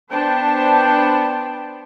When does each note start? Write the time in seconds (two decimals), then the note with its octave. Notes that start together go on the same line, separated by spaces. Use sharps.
0.11 B3 D4 C5 G5 A5